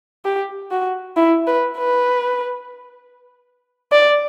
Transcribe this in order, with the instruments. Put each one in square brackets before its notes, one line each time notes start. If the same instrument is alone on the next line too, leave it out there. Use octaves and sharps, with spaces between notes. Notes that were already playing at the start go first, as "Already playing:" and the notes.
[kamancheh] G4
F#4
E4
B4
B4
D5